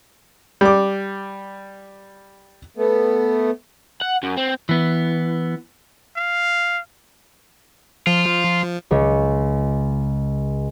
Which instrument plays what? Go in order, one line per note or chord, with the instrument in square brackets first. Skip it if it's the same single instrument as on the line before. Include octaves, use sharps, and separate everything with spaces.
[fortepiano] G3 D6
[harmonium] A3 B3
[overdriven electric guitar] F#5
F#2
C4
[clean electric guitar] E3 B3
[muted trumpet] F5
[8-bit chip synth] F3 [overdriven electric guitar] F4
[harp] C#2 C#5